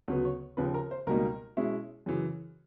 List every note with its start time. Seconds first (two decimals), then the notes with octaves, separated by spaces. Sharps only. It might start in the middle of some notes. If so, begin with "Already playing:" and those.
0.08 D2 C#3 F#3 B3 C#5
0.25 C#5
0.57 D#2 C#3 F3 B4
0.74 A#4
0.91 C5
1.07 C#2 B2 G3 A#3 D#4 A#4
1.57 B2 G#3 C#4 E4
2.06 F#2 C#3 E3 G#4